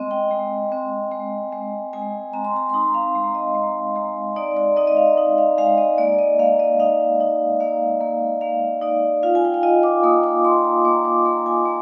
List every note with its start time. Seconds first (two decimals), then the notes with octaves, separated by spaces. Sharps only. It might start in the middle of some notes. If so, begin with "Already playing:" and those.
Already playing: G#3 C4 D#5
0.11 G5
0.31 G#3
0.72 C4
1.11 G#3
1.52 G#3
1.93 G#3 G#5
2.33 C4 A#5
2.45 C6
2.56 A#5
2.70 C6
2.74 D#4 A#5
2.94 F5
3.15 G#3
3.35 D#5
3.55 G#3
3.96 G#3
4.36 D#4 D5
4.57 D5
4.77 D#4 D#5
4.87 D#5
4.97 F5
5.17 D#4
5.38 F5
5.58 G#3 F5
5.78 D#5
5.98 A#3 D5
6.19 D#5
6.39 A#3 F5
6.59 D#5
6.80 D#4 F5
7.21 D#4
7.60 A#3 F5
8.01 A#3
8.41 A#3 F5
8.82 D#4 D5
9.23 F4 F5
9.35 G#5
9.45 G5
9.54 F5
9.63 F4 D#5
9.83 D6
10.03 A#3 D#6
10.23 D6
10.45 A#3 C6
10.65 A#5
10.85 A#3 D6
11.05 D6
11.25 A#3 A#5
11.46 G#5
11.65 A#3 A#5